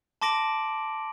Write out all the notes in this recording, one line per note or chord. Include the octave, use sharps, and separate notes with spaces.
A5 C6 D6 A#6 D7 F#7